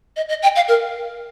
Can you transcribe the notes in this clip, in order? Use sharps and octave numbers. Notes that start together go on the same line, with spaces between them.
D#5
D#5
G5
F5
A#4